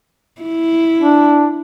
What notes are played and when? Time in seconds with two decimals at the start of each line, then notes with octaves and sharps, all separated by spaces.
0.42 E4
1.00 D4